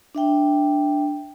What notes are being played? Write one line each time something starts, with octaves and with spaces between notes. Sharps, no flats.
D4 E5 G5